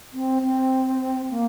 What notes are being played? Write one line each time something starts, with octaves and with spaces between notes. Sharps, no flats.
C4
C4
A#3